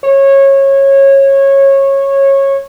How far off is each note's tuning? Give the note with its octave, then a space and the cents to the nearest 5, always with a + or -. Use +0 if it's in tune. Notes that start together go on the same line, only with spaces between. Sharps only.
C#5 -20